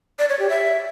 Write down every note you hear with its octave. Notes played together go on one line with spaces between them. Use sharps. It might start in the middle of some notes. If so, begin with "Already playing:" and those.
D5
C#5
G4
E5